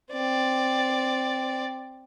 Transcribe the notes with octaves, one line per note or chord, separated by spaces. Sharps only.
C4 D5